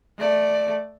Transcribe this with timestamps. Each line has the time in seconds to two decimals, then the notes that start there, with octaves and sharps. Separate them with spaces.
0.18 A3 D5